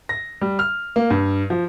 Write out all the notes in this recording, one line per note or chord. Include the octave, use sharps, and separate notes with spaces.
A#6
G3
F6
A#3
G2
F3